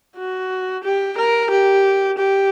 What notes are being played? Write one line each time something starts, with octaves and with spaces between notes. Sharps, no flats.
F#4
G4
A#4
G4
G4